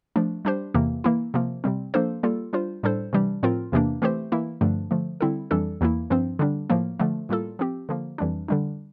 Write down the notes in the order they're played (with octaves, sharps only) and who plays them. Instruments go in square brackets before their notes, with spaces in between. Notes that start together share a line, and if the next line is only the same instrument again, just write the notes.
[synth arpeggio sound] F3 A3 D4
G3 D4 G4 C5
E2 C3 E3 A#3
E3 A#3 E4
C3 F3 A#3
C3 G3 C4
F3 A#3 D4 A4 C5
G3 A#3 F4 A4
G3 D4 F4 C5
A2 G3 D4 A4 C5
C3 E3 G3 D4
A2 F3 C4 F4 A#4
E2 C3 E3 A#3 D4
E3 A3 C4 G4 C5
E3 A#3 E4
G2 D3 F3 A3 D4
D3 F3 A3
D3 G3 C4 E4 A4
F2 E3 G3 D4 A4
E2 E3 A#3 E4
G2 F3 C4
D3 G3 D4
A2 F3 A#3
D3 F3 A3
A2 G3 A#3 F4 A4
F3 C4 G4
D3 F3 A#3
F2 E3 G3 D4
D3 G3 D4